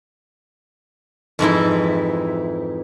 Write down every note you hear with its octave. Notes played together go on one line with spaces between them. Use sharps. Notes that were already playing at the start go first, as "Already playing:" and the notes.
F2 G#2 E3 E4